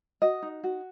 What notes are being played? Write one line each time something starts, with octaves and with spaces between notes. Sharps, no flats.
F#4 D#5
D#4
F#4